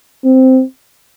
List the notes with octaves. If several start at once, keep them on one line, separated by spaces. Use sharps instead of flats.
C4